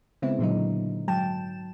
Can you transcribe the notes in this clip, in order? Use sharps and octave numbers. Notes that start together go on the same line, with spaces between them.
C#3 G#3 B3 C4 E4
A#2 D3 F#3 D#4
G#2 F#3 G5 A5 E7